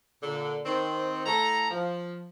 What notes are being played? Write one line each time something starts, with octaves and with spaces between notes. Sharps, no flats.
A#2 D3
D#3 C4
A2 A4 A#5
F3